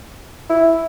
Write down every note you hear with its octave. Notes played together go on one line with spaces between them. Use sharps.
E4